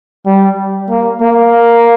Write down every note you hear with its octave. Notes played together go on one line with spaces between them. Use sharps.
G3
A#3
A#3